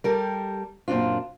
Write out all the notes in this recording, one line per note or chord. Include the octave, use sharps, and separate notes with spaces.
G3 G4 A4 A#4
F#2 A#2 C4 D4 F4